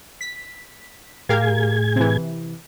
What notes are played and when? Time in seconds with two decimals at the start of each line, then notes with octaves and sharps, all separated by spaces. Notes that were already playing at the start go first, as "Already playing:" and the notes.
0.21 B6
1.29 A2 G4 G#4 A#4 F5 G#6
1.96 C3 E3